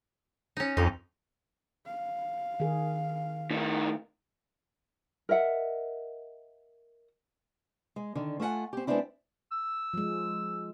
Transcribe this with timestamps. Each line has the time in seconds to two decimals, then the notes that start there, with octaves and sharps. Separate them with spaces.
0.57 C#4 D#4
0.77 F2 D#4
1.87 F5
2.60 D#3 G#4
3.51 A2 D#3 D#4
5.29 A#4 D#5 E5 F#5
7.96 G#3
8.15 D3 D#3
8.40 A3 F4 F#4 F#5 G#5
8.73 C4 G4
8.87 G#3 A3 B3 C4 D4 E4
9.52 E6
9.94 F3 G#3